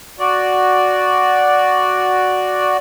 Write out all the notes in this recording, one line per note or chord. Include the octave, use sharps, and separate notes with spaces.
F#4 D5